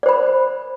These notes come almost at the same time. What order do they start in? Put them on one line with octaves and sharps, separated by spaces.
D5 C5 B5